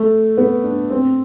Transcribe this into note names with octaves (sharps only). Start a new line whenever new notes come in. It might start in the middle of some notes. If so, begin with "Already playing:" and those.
Already playing: A3
B3
D4
C4